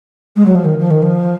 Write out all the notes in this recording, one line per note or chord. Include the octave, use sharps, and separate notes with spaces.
G#3
F#3
F3
D#3
F3
D#3
F3